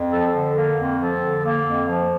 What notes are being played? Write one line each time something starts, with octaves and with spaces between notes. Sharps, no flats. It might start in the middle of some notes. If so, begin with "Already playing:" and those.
Already playing: F2
F3 A4
D3
A#3 A#4
F2
F3 A4
D3
A#3
F2
F3